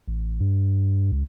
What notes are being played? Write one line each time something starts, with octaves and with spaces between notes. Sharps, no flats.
A1
G2
C#2